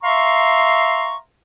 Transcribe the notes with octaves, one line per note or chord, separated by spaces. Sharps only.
E5 F5 A#5 C6 C#6